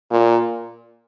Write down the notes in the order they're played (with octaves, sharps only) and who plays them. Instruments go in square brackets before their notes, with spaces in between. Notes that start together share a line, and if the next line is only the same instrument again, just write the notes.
[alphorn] A#2